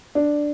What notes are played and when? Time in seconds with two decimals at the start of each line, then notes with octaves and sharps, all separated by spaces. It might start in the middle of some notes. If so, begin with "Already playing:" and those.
0.15 D4